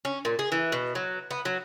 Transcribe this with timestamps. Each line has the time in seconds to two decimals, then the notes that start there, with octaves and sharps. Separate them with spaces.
0.05 C#4
0.25 A#2
0.39 G#4
0.52 E3
0.72 B2
0.95 F#3
1.31 B3
1.45 F#3